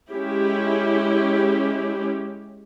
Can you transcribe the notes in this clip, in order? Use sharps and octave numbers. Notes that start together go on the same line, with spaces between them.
G#3 C#4 E4 G4